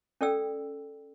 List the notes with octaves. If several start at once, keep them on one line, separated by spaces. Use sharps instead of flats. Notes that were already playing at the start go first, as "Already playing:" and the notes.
C#4 A4 D5 G5 E6